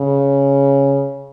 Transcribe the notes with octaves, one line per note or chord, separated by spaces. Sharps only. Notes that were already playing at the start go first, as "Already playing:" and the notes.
Already playing: C#3